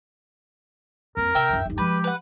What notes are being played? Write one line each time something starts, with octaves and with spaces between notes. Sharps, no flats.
F2 A#3 A#4
C3 E5 G5
F#1 C#2
G1 D#2
F3 G#3 G4 B4
B4 F#5